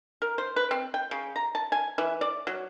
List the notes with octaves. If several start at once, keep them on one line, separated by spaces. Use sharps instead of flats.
A#4
C5
B4
C4
G5
C#3
A#5
A5
G#5
E3
D5
F#3